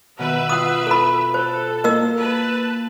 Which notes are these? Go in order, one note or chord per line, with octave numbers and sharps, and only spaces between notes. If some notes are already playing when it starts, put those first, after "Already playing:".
B2 D#3 B4 E5
F4 F#5 D#6
A4 B5
A4 C5
A#3 A#4 D#5 E6
B4 A5